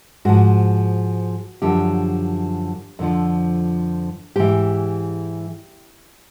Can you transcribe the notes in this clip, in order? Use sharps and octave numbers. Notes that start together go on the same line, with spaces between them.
G#2 F3 F#4
F#2 D3 F3 G4
F2 D3 F3
G#2 E3 G4